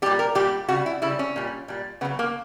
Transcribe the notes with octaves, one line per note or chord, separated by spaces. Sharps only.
A#2 G3 G4
A#4
A#2 G3 G4
C#3 G3 F#4
E4
C#3 G3 E4
C#4
A#2 G3
A#2 G3
C#3 F#3 B3
A#3